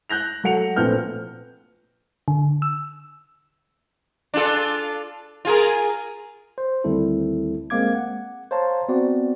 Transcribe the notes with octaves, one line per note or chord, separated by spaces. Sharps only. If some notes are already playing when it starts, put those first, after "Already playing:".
F#6 G6 A#6 F7
F#3 A4 F#5 C#7 F7
A#1 A3 C4 B4 F6 G6
D3
E6
D4 F4 A4
F4 G#4 A#4
C5
D2 D#3 G3 C4 E4 A4
G#3 A#3 C4 F5 D6 G#6
F#5
C5 C#5 F5 A5 A#5 C6
B3 C4 F#4 D5